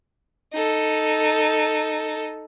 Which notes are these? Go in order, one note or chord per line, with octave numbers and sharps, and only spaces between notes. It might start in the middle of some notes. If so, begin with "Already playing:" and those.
D#4 A4